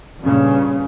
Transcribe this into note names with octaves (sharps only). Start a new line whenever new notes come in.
G2 A#2 C#3